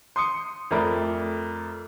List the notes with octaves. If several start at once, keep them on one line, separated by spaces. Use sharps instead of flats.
C6 D#6 C#7
F2 A3 A#4 D5 B5